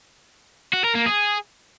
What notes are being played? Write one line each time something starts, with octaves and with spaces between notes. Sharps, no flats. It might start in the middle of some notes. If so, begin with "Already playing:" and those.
F#4
A#4
A#3
G#4